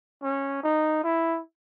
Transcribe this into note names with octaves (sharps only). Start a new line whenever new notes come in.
C#4
D#4
E4